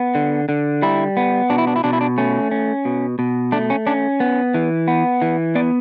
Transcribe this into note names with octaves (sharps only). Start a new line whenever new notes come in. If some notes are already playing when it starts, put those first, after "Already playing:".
Already playing: B3
D3
D3
G3 E4
B3
B2 D4
E4
D4
E4
B2 D4
E4
D4
A3 C#4
C#4
B2
B2
A3 D4
C#4
C#4 D4
B3
E3
B3
E3
B3 D5